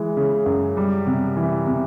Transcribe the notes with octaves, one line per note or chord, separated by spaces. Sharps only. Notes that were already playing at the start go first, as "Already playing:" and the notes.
Already playing: E3 G#3
C#3
F#2
G3
C3
E3
C3